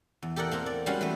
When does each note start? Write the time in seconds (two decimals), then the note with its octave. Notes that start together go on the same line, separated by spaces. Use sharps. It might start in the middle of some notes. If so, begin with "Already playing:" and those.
0.22 E2
0.36 G4 A4 A#4 D5 F#5
0.51 A#3 C4 A#4 F#5
0.66 D5
0.86 G3 G#3 C#4 F#4 F5 F#5
1.01 E3 A3 B3 G4 B4